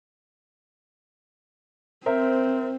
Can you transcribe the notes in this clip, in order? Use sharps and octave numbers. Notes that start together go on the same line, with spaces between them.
C4 A#4 C5 E5